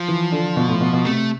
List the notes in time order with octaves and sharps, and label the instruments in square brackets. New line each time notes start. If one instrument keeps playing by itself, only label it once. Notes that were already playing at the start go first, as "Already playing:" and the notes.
Already playing: [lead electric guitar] F3
[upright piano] E3
D3
B2
A2
B2
B2
[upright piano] C3 [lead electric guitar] A3